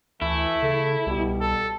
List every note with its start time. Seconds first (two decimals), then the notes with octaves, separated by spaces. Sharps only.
0.22 D2 E3 A3 E4
0.62 C#3 A4
1.07 C2 B2 G3
1.41 A4